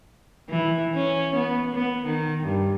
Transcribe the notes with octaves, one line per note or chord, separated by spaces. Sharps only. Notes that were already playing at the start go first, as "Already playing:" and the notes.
E3
C#4
B3
B3
D#3
G2